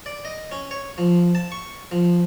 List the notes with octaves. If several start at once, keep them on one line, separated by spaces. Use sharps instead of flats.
D5
D#5
C#4
C#5
F3
A5
C#6
F3